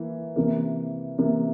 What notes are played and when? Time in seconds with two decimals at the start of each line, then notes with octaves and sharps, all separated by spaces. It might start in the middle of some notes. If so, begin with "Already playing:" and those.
Already playing: E3 A#3
0.36 C3 E3 A#3
1.18 C3 E3 A#3